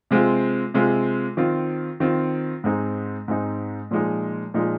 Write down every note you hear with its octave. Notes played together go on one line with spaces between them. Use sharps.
C3 G#3 C4 F4
C3 G#3 C4 F4
D#3 C4 F4
D#3 C4 F4
G#2 G#3 C4 D#4
G#2 G#3 C4 D#4
A#2 F3 G#3 D#4
A#2 F3 G#3 D#4